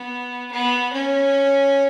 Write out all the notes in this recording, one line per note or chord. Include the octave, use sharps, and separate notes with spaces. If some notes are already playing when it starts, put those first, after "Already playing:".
Already playing: B3
B3
C#4